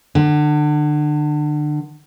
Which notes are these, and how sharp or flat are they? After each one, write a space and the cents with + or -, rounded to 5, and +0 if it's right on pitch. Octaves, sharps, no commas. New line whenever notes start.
D3 +30